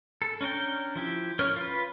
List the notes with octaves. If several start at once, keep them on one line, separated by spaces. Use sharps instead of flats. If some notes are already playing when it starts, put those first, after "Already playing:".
A4
C#4 D4 A#4 G5
F3 E4 G4
C#4 A#4 C#5 F6
F4 B4